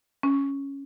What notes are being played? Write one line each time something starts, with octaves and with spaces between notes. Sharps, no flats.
C#4